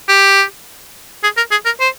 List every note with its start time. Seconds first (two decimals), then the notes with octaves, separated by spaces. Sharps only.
0.08 G4
1.23 G#4
1.37 A#4
1.51 G#4
1.65 A#4
1.80 C5